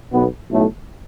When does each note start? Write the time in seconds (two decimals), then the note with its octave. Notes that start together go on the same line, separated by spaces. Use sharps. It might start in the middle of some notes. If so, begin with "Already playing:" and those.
0.12 B1 B2 B3
0.49 B1 A2 A3